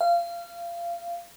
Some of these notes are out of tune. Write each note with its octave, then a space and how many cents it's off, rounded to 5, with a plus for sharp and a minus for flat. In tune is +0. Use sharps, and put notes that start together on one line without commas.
F5 -25